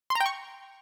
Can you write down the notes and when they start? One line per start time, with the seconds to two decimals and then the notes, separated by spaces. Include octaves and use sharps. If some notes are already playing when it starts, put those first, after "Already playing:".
0.10 C6
0.15 A#5
0.21 G5
0.26 C#6